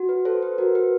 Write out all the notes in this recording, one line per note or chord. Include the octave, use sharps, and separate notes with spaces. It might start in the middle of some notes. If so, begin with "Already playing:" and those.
Already playing: F#4
B4
A4 C5
B4
F#4 A#4
B4